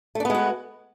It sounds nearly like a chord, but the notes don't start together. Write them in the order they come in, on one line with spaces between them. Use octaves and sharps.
A3 D4 B3 G#3 F#4